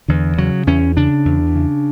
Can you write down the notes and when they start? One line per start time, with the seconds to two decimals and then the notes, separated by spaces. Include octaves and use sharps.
0.08 E2 D3
0.38 C#3 F#3
0.67 E2 C#4
0.97 C#3 D4
1.25 E2
1.55 C#3